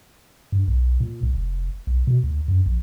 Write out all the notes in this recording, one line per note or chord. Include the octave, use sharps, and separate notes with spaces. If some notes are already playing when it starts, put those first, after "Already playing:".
G2
B1
A#2
C2
F1
B1
B2
D2
F#2
A#1